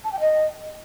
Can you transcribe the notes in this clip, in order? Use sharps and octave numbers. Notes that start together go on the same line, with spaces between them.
A5
G5
D#5